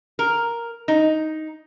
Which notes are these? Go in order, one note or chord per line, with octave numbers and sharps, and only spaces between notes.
A#4
D#4